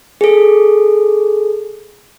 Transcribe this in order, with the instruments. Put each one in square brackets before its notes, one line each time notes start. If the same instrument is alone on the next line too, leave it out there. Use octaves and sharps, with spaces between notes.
[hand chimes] G#4 A4